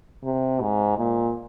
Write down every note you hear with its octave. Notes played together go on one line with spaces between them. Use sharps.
C3
G#2
A#2